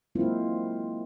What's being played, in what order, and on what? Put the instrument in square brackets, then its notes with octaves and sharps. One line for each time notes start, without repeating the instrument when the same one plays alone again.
[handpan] F#3 G#3 A#3 C4 E4 F4